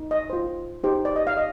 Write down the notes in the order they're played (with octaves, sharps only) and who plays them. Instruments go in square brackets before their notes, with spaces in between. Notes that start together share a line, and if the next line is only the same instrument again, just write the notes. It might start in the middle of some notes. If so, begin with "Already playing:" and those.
Already playing: [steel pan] D#4
D#5
F4 C5
D#4 G4 C5
D5
D#5
F5
D#5